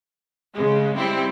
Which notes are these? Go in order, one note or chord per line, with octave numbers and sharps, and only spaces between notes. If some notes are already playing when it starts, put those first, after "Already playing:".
C#3 G#3
G3 C4 E4